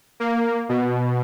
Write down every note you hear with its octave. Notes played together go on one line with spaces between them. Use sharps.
A#3
B2